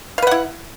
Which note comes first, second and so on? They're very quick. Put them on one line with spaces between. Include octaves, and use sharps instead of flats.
F5 B4 F#5 E4